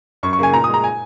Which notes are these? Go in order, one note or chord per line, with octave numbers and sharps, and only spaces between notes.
F#2 C#6
C#6
C#3 A#3 G#5
A#2 A#5
D#6
G#3 A#5
G#5